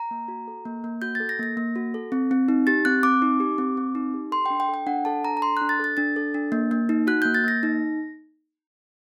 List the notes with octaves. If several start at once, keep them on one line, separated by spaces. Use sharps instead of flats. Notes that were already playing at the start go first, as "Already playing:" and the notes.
Already playing: A#5
A#3
F#4
A4
A#3
A#3
F#4 G6
A4 A6
A#6
A#3 A#6
A#3
F#4
A4
C4
C4
D#4
G4 A6
C4 F#6
C4 D6
D#4
G4
C4
C4
D#4
G4
A4 C6
D4 G5
G5
A4
G5
D4 F#5
A4 A5
D4 A#5
A#5
A4 C6
D4 F#6
A6
A4 A6
D4 A6
A4
D4
A#3
A#3
D#4
F#4 F#6
A#3 G6
A6
A#3 A#6
D#4